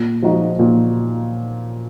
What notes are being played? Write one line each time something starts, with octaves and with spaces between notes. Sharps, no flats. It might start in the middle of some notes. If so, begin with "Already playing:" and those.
Already playing: A#2
F3 G#3 D#4 F#4
A#2